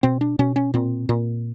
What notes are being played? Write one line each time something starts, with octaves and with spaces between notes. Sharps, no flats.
B2 C4
D4
B2 C#4
C#4
A#2 C4
A#2